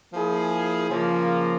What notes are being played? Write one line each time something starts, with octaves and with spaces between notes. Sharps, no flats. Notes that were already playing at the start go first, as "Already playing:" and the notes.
F3 A#3 E4 G#4
C#3 F3 A#3